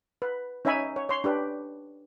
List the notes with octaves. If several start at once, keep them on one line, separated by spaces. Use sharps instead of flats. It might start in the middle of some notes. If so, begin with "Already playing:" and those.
B4
C#4 D#4 C#5 E5 G#5 B5
C#5
C#5 C6
D4 G4 B4